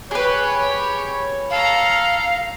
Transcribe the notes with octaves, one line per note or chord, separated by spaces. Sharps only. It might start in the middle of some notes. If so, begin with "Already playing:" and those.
G4 G#4 B4 C#5
A4 F5 A#5